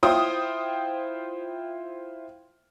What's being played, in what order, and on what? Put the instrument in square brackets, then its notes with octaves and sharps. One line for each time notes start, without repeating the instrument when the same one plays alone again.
[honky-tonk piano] E4 F4 C5 G5 D#6